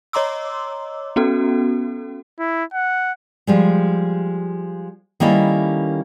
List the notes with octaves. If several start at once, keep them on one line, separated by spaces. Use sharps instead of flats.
C#5 D#5 A#5 C6 D6 E6
B3 C#4 F#4 A4
E4
F#5
F3 G3 G#3
D#3 G3 A#3 C#4 E4 A4